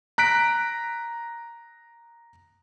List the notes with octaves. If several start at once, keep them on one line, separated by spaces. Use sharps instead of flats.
A#5 F#6 B6 D7